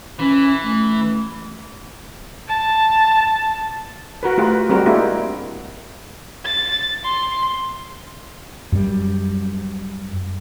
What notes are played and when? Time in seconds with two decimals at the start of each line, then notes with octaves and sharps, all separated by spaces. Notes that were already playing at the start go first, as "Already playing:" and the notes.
0.19 E3 C#4
0.62 A3
2.48 A5
4.23 F#4 A#4 B4
4.37 A3 F4 G4 B4
4.69 G3 G#3 C4 F#4 A#4
4.86 G#3 A#3 D4 E4 F#4 G4
6.45 A6
7.04 C6
8.72 F#2 G3